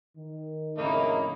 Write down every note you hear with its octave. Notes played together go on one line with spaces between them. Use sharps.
D#3
F2 A2 C#3 A#3 D#4 E4 A#4